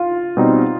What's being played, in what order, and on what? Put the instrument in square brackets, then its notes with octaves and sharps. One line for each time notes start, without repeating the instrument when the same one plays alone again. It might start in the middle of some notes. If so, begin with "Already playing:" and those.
Already playing: [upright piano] F4
[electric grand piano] B2 G3 C4 D#4